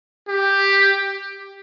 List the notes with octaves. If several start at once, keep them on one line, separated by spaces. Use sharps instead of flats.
G4